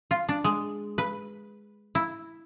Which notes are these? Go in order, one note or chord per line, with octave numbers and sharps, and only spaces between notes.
F4
D4
G#3
B4
E4